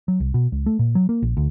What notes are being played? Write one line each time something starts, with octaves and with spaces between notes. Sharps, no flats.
F#3
C2
B2
C#2
A3
A#2
F#3
A#3
A#1
D2